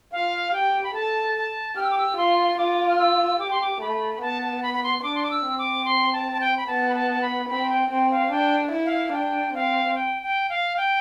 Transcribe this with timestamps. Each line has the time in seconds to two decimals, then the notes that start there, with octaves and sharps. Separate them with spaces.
0.12 F4 F5
0.53 G4 G5
0.84 B5
0.94 A4 A5
1.35 A5
1.76 G4 F6
1.83 E6
1.91 D6
1.98 E6
2.17 F4 C6
2.58 F4 D6
2.89 F6
2.99 E6
3.40 G4 D6
3.51 C6
3.61 D6
3.81 A3 B5
4.15 B5
4.21 B3 A5
4.42 A5
4.63 B5
4.74 B5
4.84 C6
4.99 C6
5.03 D4 D6
5.15 C6
5.23 D6
5.31 E6
5.45 C4
5.58 D6
5.85 C6
6.13 A5
6.32 A5
6.41 G5
6.57 B5
6.67 B3 A5
6.89 B5
6.95 A5
7.11 A5
7.22 B5
7.49 C4 B5
7.69 G5
7.90 C4 G5
8.11 F5
8.31 D4 G5
8.72 E4
8.85 F5
9.13 D4 G5
9.54 C4 F5
9.95 G5
10.23 G5
10.50 F5
10.77 G5